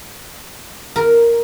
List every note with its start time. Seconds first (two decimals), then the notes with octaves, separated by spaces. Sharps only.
0.96 A#4